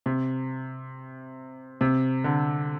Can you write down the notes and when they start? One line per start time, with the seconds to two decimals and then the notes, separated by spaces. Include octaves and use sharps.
0.06 C3
1.81 C3
2.24 D3